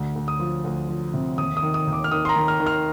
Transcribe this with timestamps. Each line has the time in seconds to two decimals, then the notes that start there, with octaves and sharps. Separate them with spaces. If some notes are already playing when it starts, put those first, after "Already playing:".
Already playing: D2
0.16 D2
0.28 D#6
0.40 F3
0.64 D2
0.89 F3
1.14 C3
1.38 D#2 D#6
1.57 D#6
1.62 D#3
1.74 D#6
1.87 D#2
1.93 D6
2.04 F6
2.11 D#3 D#6
2.25 C6
2.29 A#5
2.36 D#3
2.48 F6
2.60 D#3
2.66 F6